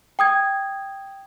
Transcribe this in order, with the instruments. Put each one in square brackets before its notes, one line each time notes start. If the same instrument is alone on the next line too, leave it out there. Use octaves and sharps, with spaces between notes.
[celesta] G5 D#6 G#6